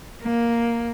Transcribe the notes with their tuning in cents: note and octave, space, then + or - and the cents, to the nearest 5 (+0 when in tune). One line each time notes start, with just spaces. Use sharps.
A#3 +5